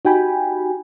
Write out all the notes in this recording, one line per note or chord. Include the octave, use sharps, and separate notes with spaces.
D#4 F#4 G4 G5 G#5 B5